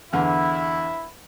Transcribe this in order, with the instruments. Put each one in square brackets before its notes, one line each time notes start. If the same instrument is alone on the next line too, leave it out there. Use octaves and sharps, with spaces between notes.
[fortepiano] E2 D3 [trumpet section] E4